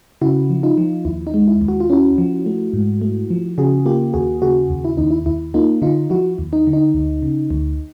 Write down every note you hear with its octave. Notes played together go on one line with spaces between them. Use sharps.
C#3 E4 F#4
F3
D#4 F4
F3
D#2 E4
D#4
G#3
E4
D#2
F#4
F4
C#4 E4 F#4
F3
A3
G#2
A3
F3
C#3 F#4 G#4
A#3 F4 G4
D#2 F#4 G#4
C#3 F#4 G#4
D#2
E4
D#2 D#4
E4
D#2 E4
A#3 D#4 F4
D3 D#4 F4
F3 E4 F#4
D#2
D#4
D3
D#4
D2
C#3
D2